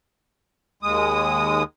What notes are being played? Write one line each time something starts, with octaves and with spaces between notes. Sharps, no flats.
D#2 G#3 D#6